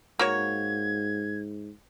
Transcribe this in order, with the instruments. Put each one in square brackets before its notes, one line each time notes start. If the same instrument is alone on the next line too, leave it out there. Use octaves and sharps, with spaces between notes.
[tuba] G#2 [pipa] A#3 F#4 C#5 [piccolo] G#6